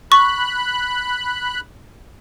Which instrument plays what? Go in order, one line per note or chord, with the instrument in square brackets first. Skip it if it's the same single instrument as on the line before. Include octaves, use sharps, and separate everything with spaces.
[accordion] B5 F#6 [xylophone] C#6